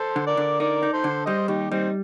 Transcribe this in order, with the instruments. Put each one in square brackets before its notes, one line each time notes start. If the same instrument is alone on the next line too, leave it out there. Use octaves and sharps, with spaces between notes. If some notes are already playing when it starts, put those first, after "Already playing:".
Already playing: [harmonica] A4 C5
[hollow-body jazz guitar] D3
[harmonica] A#4 D5
[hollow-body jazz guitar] D3
[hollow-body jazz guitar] D#4 [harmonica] A#4 D5
[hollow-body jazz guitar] D#4
[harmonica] A4 C5
[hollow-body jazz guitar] D3
[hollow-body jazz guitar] G3 [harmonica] C5 D#5
[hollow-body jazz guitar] D#2 [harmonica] D#4 G4
[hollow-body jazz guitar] G3 [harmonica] C4 D#4